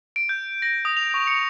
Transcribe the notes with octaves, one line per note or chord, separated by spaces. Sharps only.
D7
G6
A#6
D#6
F7
C#6
C#7